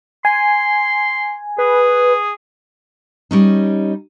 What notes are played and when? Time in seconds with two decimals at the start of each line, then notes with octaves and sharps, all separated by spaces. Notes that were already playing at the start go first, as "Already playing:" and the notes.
0.25 G#5 C6
1.58 G#4 B4
3.31 G3 C#4 D#4